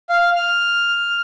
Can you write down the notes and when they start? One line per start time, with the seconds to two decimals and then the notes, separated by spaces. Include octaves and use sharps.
0.10 F5
0.36 F6